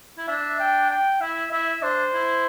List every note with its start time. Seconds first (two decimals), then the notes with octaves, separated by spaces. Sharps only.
0.18 E4
0.28 D4 E5
0.60 G5
0.91 G5
1.21 E4 E5
1.52 E4 E5
1.83 D4 C5
2.14 E4